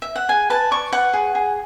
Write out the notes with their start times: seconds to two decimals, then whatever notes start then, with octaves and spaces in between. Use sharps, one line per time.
0.02 E5
0.16 F#5
0.29 G#4 G#5
0.50 B4 A5
0.71 D5 C#6
0.93 B4 F#5
1.13 G#4
1.35 G#4